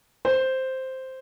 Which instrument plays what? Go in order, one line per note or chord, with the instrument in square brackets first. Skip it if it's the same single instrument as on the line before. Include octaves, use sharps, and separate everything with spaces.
[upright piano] C5